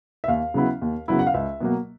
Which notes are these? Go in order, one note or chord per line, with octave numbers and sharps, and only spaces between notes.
E5
D#2 F5
C#3 F#3 B3 E4
D#2
C#3 F#3 B3 E4
F#5
F5
C#2 E5
B2 F#3 A#3